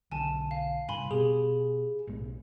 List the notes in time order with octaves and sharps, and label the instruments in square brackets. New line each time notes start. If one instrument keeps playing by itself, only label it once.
[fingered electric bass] B1 D3 [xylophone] G#5 A5
[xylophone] F5
[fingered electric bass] G2 C3 [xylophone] G#5 B5 C6
[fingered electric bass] B2 [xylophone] G4 [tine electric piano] G#4
[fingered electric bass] B1 A2 G#3